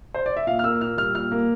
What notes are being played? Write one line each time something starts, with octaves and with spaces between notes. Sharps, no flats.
C5
D5
E5
A#2 F5
F6
A#3 E6
A#2 F6
G3 F6
A#2 F6
A#3